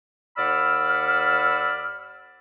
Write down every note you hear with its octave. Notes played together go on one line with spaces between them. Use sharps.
D#2 D5 F#5 B5 E6 F6